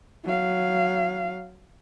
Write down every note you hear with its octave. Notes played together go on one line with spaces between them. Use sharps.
F#3 F5